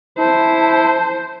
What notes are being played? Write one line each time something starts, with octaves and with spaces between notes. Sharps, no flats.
E4 C5 A5